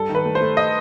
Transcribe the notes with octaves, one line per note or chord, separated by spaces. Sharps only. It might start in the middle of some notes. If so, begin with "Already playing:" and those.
Already playing: G2 A4
D#3
B4
A3
C5
A3
D#5